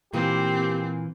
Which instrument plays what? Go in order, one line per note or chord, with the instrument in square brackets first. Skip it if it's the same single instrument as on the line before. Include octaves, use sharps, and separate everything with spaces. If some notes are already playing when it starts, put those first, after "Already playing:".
[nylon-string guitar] A#2 E3 A#3 [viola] C4 [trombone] G4